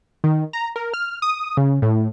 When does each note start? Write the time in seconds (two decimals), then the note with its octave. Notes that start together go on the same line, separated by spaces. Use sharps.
0.24 D#3
0.53 A#5
0.76 A#4
0.94 F6
1.22 D#6
1.57 C#3
1.82 A2